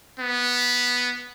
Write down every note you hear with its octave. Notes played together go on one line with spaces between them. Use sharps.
B3